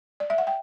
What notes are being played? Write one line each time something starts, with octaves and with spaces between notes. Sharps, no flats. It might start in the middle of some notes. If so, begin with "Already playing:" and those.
D5
E5
F#5
G5